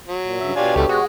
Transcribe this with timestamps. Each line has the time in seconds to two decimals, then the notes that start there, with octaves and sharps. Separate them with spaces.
0.08 F#3
0.23 A#2
0.40 G2 C#3 E5
0.56 B2 D4 F4 G4 C#5 G#5
0.76 C#2 D3 G3 A3
0.89 G#3 F#4